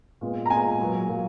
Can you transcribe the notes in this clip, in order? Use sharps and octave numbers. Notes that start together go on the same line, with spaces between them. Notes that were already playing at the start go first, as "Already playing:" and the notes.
A#2 G#3 B3
A#5
A#2 G#3 B3 G#5
A#2 F#3 A#3
A#2 F#3 A#3